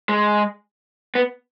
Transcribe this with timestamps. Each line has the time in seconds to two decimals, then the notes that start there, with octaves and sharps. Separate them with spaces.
0.09 G#3
1.15 B3